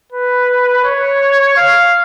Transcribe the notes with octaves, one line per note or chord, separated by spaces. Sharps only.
B4
C#5
F5